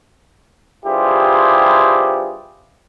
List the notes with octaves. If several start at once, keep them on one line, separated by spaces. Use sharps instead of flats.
G2 E4 F4 G4 G#4 C5